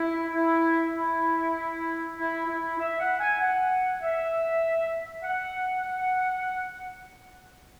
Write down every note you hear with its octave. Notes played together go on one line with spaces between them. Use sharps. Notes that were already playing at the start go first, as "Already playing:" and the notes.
Already playing: E4
E4
E4
E4
E4
E5
F#5
G#5
F#5
E5
F#5